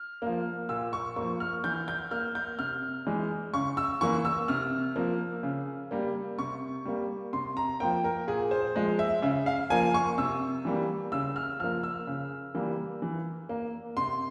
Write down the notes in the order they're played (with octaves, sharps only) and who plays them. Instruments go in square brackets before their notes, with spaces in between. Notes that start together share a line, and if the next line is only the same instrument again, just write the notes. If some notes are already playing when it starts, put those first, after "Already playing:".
Already playing: [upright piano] F6
F3 A#3
A#2 E6
C#6
F3 A#3 C#6
F6
E3 G6
G6
A#3 F6
G6
C3 F6
E3 G#3
C#3 C#6
E6
E3 A#3 C#6
E6
C3 F6
F3 A#3
C#3
G3 A#3
C3 C#6
G3 A#3
C3 C6
A#5
F3 A#3 G5
A#4
A#2 G#4
C5
F3 G#3
E5
C#3 E5
F5
F3 A#3 G#5
C#6
C3 E6
E3 G3 A#3
C#3 E6
F6
F3 A#3 F6
E6
C#3
E3 G3 A#3
E3
A#3
C3 C6